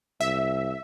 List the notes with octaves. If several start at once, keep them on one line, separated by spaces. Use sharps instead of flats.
C2 E5